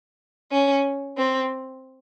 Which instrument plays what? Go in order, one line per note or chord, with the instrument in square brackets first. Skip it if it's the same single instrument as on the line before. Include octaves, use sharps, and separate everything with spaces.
[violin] C#4
C4